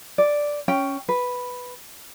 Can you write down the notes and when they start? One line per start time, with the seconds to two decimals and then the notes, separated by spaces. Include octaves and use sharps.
0.18 D5
0.68 C#4 G5
1.09 B4